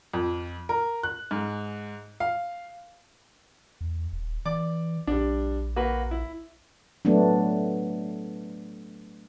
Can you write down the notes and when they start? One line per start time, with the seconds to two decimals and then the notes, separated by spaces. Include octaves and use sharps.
0.13 F2
0.69 A#4
1.03 F#6
1.31 G#2
2.20 F5
3.81 E2
4.12 D#1
4.45 E3 D5 D6
5.07 A#1 G3 D4
5.76 A#3 F#4 B4
6.11 E4
7.05 F#3 A3 B3 D4